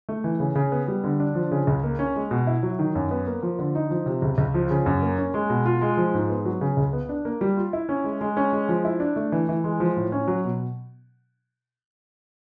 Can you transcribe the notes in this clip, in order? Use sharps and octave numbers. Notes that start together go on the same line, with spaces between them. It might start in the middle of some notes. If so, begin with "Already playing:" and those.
A3
E3
C#3
C#3
B3
G3
D3
D4
F3
C#3
C#2
A#3
C#4
G#3
B2
E4
F#3
D#3
F#2
B3
A#3
F3
D3
D#4
F3
C3
C#2
C#2
F3
C#3
F#2
A#3
C#4
G#3
B2
F4
G#3
F3
G#2
B3
F#3
C#3
C#2
B3
D4
A#3
G3
F4
E4
C#4
G#3
G#3
C#4
G#3
F3
E4
D4
A3
E3
E3
G#3
F3
A2
C#4
F#3
B2